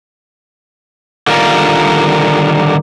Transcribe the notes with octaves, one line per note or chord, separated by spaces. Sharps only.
D3 D#3 G3 F4 A#4